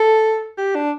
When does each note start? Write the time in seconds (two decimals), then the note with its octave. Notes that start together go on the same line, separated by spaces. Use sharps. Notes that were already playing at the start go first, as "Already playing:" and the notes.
Already playing: A4
0.58 G4
0.75 D4